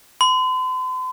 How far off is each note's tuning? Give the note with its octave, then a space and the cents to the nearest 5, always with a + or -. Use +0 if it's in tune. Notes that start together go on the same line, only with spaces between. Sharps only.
C6 -45